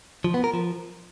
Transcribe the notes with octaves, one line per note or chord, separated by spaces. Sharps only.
F3
B3
A#4
F3